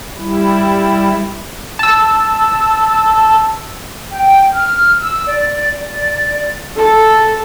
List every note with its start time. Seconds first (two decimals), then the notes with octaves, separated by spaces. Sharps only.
0.17 G3 E4
1.79 A5 E6
4.11 G5
4.52 F6
4.99 E6
5.26 D5
5.89 D5
6.77 A4